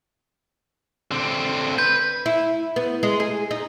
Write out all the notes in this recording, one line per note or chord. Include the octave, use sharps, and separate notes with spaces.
D3 C4
B4 G6
E4
B3
G#3
G#4
D#4